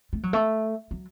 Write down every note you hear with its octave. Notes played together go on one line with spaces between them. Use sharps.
A3
F#3
A3
F#3